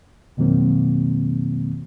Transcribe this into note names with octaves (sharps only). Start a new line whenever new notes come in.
F2 B2 D#3 F#3 A#3 C4